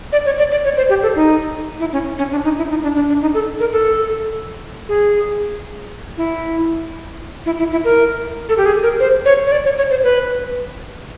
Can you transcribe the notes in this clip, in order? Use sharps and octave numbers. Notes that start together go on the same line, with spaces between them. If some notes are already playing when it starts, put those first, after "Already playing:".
D5
C#5
D5
D5
C#5
C5
G4
A4
D#4
E4
C#4
C#4
D4
D#4
E4
D#4
D4
D4
D4
D#4
A4
A#4
A4
G#4
E4
E4
E4
E4
A#4
A4
G4
G#4
A#4
C5
C#5
C#5
D5
C#5
C#5
C5
B4